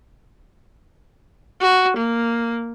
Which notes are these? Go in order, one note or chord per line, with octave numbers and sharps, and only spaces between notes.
F#4
A#3